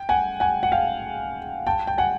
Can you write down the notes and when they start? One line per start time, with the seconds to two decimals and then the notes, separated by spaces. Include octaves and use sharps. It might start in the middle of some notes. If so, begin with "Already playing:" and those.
Already playing: G5
0.09 F#5 G#5
0.40 F#5 G#5
0.63 F#5
0.72 F5 G5
1.66 G5 A5
1.87 G5
1.98 F#5 G#5